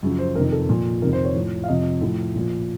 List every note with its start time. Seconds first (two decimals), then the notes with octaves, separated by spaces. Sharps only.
0.03 F#2 C#3 F3
0.19 C5
0.36 F2 C3 D#3 A#4
0.52 A4
0.69 A#2 F3
1.02 F2 C3 D#3 A#4
1.13 C5
1.25 C#5
1.35 A2 F3
1.64 F5
1.68 F2 C3 F3 D#5
2.01 A2 F3
2.36 A#2 F3